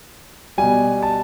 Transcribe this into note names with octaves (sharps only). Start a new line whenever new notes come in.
B2 G3 G#5
A5